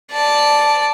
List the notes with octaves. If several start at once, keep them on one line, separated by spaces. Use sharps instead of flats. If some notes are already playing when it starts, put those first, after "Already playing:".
D5 A5